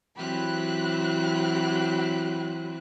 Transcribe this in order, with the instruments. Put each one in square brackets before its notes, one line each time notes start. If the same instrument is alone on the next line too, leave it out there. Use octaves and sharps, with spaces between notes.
[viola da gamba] E3 F#3 C4 [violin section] G4 B5 F#6